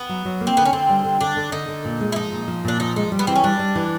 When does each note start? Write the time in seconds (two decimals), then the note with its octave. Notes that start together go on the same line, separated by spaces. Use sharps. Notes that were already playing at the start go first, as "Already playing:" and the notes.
Already playing: B3
0.09 F#3
0.25 F#3
0.41 A#3
0.47 C4
0.57 D3 B3
0.65 C#4
0.73 D3 C4
0.89 G3
1.05 D3
1.21 D3 D4
1.37 D3
1.52 D3 D#4
1.68 D3
1.85 A#2
2.00 G#3
2.12 E4
2.16 F3 D#4
2.32 A#2
2.48 F3
2.65 A#2 D4
2.80 F3 D#4
2.96 G#3 D#4
3.12 G3
3.19 B3
3.27 E3 C4
3.36 C#4
3.43 G3 D4
3.59 G3
3.75 E3